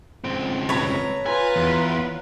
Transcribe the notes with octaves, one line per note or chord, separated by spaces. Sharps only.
C#2 C4
A4 B4 C#5 A#5 B5
F4 B4 G#5 A#5
E2